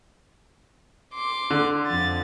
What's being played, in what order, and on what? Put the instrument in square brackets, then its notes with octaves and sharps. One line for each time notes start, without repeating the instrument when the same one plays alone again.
[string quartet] C6 D6
[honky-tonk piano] D3
[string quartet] F2 A6